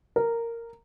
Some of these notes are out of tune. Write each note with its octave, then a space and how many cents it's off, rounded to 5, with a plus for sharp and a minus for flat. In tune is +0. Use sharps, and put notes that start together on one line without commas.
A#4 -10